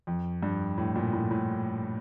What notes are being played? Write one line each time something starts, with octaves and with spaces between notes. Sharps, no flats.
F2
G2
A2
A#2
A2
A2